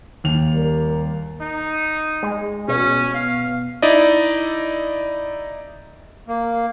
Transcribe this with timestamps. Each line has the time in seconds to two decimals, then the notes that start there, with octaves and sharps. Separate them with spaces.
0.24 D#2 F7
0.53 G3 A#4
1.41 D#4
2.23 G#3
2.68 B2 C#4
3.14 F5
3.82 D#4 E4 D5 D#5
6.28 A#3